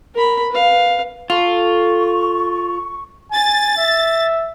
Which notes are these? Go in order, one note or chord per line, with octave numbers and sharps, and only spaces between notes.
A#4 B5
B4 F5
F4 A4 C#6
G#5 A6
E5